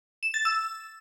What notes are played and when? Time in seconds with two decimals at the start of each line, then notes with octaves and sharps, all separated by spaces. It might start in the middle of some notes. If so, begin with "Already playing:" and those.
0.23 E7
0.34 A6
0.45 E6